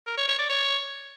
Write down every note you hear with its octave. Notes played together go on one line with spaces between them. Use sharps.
A#4
C#5
C#5
D5
C#5